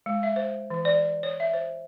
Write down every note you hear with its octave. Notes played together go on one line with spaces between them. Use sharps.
G#3
E5
C5
E3
D5
C#5
E5
C5